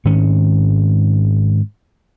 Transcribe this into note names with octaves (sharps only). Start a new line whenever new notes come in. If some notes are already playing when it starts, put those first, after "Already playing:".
G#2 D#3 C#4